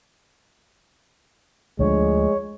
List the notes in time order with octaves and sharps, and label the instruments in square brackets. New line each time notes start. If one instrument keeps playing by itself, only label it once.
[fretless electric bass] D2 D3 F3 [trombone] G#3 [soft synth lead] C#5